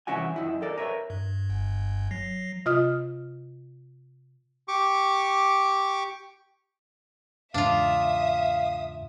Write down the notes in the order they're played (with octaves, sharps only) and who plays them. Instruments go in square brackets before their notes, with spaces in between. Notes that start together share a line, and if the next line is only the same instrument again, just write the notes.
[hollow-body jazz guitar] C2 E3 C#4 E4 F#4 G#5
F#2 D#3 E4
A4 A#4 D5
A#4 B4 C#5 E5
[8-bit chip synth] G2
G1 G2
F#3 A#6 C7
[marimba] C3 F4 D#5 D#6 F6
[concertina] G4 C#6 D6
[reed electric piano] E2 G#2 C#3 [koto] D4 F4 [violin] E5 D#6 [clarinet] F5